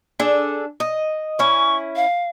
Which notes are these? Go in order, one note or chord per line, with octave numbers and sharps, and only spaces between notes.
D4 G#4 A4
D#5
C#4 E4 C#6
F5